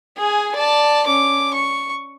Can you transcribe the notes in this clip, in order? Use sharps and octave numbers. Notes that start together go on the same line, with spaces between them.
G#4 G#5
D5 A5
C#4 D6
C#6